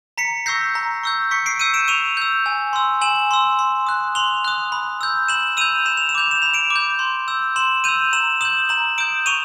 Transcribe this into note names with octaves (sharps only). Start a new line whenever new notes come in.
A#5 B6 C#7
C#6 E6 G6 A#6 C7
A#5
C#6 E6 G6
C#6 B6 C#7
C7 D7
E6 G6 C#7 D#7
D7 E7
C#6 D#7 F7
E6 G6
G#5
C6 E6
G#5 E7 F#7
C6 E6
C6
D#6 F#6
C6 F7 G7
D#6 F#6
B5
E6 G6
B5 E7 F#7
E6 G6 D#7 F7
B5 E7
F7
E7
D6 G6 F7
E7
B5 F7
D7 E7
D6
G6
C6
E6 G6
C6 E7 F#7
E6 G6 D#7 F7
A#5 E7 F#7
D#6 G6 E7 F#7
A#5 E7 F#7
D#6 G6 D7 E7
C#6 D#7 F7